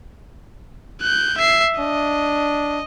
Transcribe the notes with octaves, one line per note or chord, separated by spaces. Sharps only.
F#6 G6
E5 C7
D4 D#5